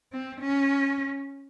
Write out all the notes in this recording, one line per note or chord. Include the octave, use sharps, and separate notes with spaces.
C4
C#4